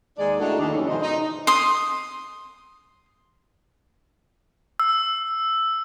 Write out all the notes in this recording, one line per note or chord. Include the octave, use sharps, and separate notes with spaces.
D#2 G#3 D#4 D5
A2 A3 D4 D#4 F#4 A4
D#2 D4
F#2 D3 E3 C#4 A4
G#2 B2 E3 C5 D#5
D#4
C6 D#6
E6